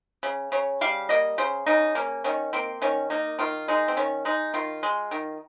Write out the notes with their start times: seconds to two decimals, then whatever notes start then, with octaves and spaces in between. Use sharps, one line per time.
0.23 C#3
0.52 C#3 C#5
0.81 G3 F5
1.09 A#3 D#5
1.38 C#3 C5
1.66 C#3 D#4
1.95 A#3 C#4
2.24 D#3 C#4
2.53 A#3 C4
2.82 D#3 C#4
3.10 A#3 D#4
3.39 D#3 F4
3.68 G#3 D#4
3.88 C4
3.97 D#3 C#4
4.25 G#3 D#4
4.54 D#3 F4
4.83 G#3
5.11 D#3